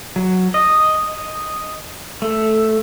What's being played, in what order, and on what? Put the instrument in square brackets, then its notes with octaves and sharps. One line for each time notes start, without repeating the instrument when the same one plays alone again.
[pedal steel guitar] F#3
D#5
A3